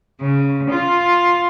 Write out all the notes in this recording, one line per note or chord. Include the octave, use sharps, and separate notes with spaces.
C#3
F4